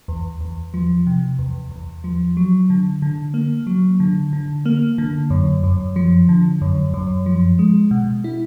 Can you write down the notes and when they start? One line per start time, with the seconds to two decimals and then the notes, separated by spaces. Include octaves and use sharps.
0.08 E2
0.41 E2
0.74 F3
1.07 C3
1.39 E2
1.71 E2
2.04 F3
2.37 F#3
2.70 D3
3.02 D3
3.34 A#3
3.67 F#3
4.00 D3
4.33 D3
4.66 A#3
4.98 D3
5.30 F#2
5.64 F#2
5.96 F3
6.29 D3
6.61 F#2
6.94 F#2
7.26 F3
7.59 G#3
7.91 B2
8.24 E4